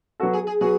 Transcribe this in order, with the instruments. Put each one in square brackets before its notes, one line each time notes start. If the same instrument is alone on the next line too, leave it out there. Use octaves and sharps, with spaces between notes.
[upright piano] F#3 B3 F#4 A4
[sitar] G#4
G#4
[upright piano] F#3 B3 F#4 [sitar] G#4